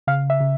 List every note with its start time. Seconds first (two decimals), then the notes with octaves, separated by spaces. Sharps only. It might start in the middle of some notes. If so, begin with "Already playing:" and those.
0.07 C#3 F5
0.30 E5
0.40 C#3